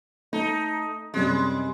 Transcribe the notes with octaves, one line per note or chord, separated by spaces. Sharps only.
A3 D#4
F#2 C3 G3 G#3